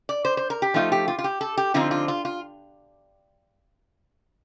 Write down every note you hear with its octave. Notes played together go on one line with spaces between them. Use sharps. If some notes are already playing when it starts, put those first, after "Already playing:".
D5
C5
C5
A#4
G4
F3 A3 D#4 F4
G4
F4
F4
G4
A4
G4
D3 F3 C4 D#4 F4
F4
F4
F4